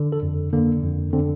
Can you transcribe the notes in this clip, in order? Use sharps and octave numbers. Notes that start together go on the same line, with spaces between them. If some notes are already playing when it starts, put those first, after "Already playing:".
Already playing: D3
A4
F2
D3 A#3
F2
D3 C4